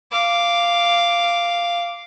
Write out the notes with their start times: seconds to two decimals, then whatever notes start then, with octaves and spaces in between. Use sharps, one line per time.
0.11 F5 D6